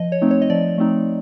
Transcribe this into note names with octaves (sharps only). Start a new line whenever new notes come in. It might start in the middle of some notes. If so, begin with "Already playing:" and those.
Already playing: F3 D#5
C#5
A3 C4 D#4
C#5
D#5
F3 D5
A3 C4 D#4